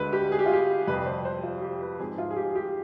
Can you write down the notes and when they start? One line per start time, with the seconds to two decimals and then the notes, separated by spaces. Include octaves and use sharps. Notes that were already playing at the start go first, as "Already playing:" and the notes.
Already playing: D2 D3 G#3 B4
0.13 G4
0.32 G#4
0.39 G4
0.46 F4
0.53 G4
0.87 F2 C3 G3 B4
1.06 C5
1.25 C5
1.43 F4
1.61 G4
1.81 B4
1.99 G#2 F3 C4 G#4
2.18 F4
2.31 G#4
2.37 G4
2.56 G4